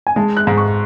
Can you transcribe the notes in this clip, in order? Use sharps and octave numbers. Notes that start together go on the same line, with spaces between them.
G#5
G#3 A5
F#6
G#2
C#6